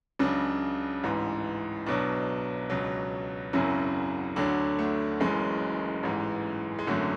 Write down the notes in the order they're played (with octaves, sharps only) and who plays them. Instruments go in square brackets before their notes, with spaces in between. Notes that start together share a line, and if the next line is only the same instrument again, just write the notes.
[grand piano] C#2 C#3 F#3 D4
A1 G#2 E3
B1 B2 F#3 D4
C#2 B2 F#3
G#1 F#2 C#3 F#3 E4
D2 D3 F#3 D4
A3
F#1 F#2 C#3 E3 G#3
A1 G#2 E3
G#3
G#1 F#2 D3 F#3 A3